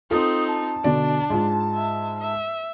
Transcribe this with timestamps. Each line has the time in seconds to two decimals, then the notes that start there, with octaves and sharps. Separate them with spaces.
0.11 C4 D#4 F4 A4 D#6
0.47 A5
0.84 B2 D3 D4 D5
1.30 G#2 G#3 F4
1.75 E5
2.20 E5